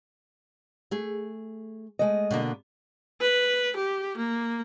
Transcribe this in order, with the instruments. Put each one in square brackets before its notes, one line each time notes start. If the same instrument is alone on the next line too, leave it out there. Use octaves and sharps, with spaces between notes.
[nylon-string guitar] A3 G#4
[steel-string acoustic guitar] G#3 A3 D#5
[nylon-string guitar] B2 D3 A#3
[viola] B4
G4
A#3